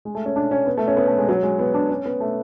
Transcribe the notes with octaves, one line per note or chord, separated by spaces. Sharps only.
G#3
A3
C#4
D4
C#4
B3
A3
C#4
B3
A3
G#3
F#3
G#3
B3
D4
C#4
B3
A3